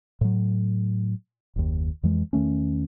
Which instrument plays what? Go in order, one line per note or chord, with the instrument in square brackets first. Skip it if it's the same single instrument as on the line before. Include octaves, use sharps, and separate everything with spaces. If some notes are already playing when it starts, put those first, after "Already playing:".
[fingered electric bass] A2 F#3
F#1 D#2
F2 E3 G#3
E2 D#3 A3 C#4